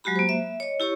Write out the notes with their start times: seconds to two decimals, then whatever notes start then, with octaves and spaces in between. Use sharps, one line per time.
0.04 F#3 G#3 F#4 G4 B5
0.16 A#3 C5
0.29 E5
0.60 C#5 D#5
0.80 E4 G4 C#5 C#6